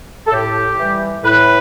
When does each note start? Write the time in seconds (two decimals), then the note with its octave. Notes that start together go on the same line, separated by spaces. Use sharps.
0.27 A4
0.32 A2 G4
0.78 E3 G3
1.23 A2 B4